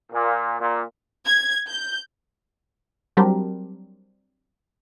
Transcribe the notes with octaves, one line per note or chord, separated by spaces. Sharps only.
A#2
A#2
G#6
G6
F#3 G3 C4 D4 G4 A#4